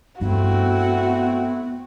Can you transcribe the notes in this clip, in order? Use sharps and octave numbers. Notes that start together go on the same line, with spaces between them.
G2 A3 B3 C4 E4 F#4